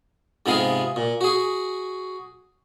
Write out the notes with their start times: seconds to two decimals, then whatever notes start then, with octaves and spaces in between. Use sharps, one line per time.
0.46 G#2 C3 G#3 B3 F4 G#4
0.96 A#2
1.21 F#4 G#4